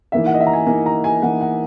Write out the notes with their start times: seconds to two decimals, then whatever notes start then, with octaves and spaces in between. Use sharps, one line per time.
0.12 E3 A#3 D#4 E5
0.26 F#5
0.34 D#5
0.40 E5
0.46 A#5
0.53 G#5
0.67 E3 A#3 D#4 G#5
0.86 A#5
1.04 G#5
1.22 E3 A#3 D#4 F#5
1.41 F#5